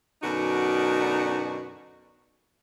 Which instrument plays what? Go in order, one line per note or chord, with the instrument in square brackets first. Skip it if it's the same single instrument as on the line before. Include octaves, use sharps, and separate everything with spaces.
[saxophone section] F#2 B2 D3 D4 D#4 F#4